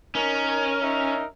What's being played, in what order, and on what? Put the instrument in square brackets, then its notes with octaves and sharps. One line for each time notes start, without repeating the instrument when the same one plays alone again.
[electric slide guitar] C#4 [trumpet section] D#4 A#4
[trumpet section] D#4 A#4 E5